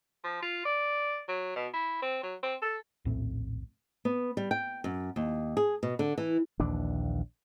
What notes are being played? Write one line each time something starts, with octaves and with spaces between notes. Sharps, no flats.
F3
F4
D5
F#3
B2
E4
C4
F#3
C4
A4
A#1 D#2 A2 C4
B3
G3
G5
F#2
D#2
G#4
B2
D3
E3
A#1 D#2 E3 D4